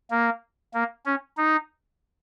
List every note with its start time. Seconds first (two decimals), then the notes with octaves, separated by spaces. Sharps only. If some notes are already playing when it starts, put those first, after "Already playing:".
0.10 A#3
0.74 A#3
1.05 C#4
1.37 D#4